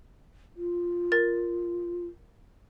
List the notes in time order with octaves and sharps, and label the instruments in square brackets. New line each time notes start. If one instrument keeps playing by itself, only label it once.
[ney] F4
[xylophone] A#4 A6